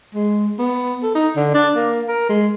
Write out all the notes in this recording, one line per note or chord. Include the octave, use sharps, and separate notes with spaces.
G#3
B3
A4
D#4
D3
D4
A#3
A#4
G#3